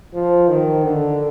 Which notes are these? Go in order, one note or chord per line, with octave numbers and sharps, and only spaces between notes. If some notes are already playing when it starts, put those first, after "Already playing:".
F3
D#3
D3